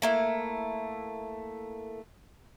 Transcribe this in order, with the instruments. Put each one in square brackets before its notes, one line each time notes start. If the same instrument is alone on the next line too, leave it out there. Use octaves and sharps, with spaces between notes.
[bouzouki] A3 A#3 E4